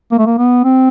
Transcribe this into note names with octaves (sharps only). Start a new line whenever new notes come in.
A#3
A3
A#3
B3
C4